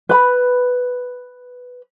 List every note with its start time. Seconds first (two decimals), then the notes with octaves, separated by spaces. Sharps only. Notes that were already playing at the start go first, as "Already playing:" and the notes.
0.09 B4 B5